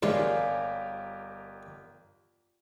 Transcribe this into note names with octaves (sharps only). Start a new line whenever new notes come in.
G1 G#2 G3 F4 G4 G#4 A#4 C#5